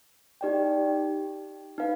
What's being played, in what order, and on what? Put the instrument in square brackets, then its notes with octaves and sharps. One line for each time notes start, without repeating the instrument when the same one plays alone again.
[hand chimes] D#4 G4 D5 G5
D#4 B4 F5